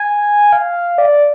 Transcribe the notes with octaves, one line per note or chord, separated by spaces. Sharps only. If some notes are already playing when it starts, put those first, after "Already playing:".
Already playing: G#5
F5
D5